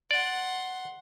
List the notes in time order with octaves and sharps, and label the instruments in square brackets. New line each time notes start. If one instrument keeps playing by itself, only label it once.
[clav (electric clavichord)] D5 [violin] F#5 C6